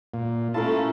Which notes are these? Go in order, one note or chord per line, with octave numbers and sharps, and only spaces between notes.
A#2
A3 C#4 E4 F4 A4 A#4 A5